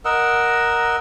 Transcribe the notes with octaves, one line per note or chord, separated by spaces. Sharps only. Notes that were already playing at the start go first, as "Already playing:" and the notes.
A#4 D#5 F#5 E6